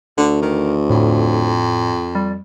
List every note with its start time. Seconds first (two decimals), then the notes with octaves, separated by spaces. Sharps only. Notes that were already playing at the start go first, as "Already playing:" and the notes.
0.18 D2 D3
0.42 D#3
0.90 F2 A2
2.15 G3